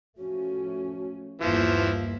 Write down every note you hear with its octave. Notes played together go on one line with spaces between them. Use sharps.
F3 A3 C#4 F#4
G1 D#2 E3 F3 A#3 F4